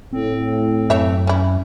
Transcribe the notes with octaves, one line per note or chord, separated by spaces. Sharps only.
A2 C4
F#2 A3 C#5 E5
C#4 E4